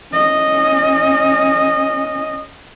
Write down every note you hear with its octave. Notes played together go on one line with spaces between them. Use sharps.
C#4 D#5